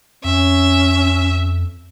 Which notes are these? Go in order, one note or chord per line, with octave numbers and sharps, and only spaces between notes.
F2 C#4 E5